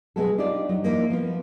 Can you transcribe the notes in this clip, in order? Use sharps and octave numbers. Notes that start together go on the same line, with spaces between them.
B2 F#3 G#3 B3 A4
D4 D#4 F4 G4 D5
F#3 D#4
F3 A#3 D#4 E4
F3 B3 F4